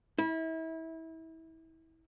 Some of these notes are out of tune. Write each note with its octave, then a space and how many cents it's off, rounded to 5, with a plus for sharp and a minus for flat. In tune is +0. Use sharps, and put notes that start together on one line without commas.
E4 -30